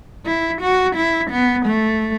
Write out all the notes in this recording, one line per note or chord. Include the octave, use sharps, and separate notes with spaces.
E4
F#4
E4
B3
A3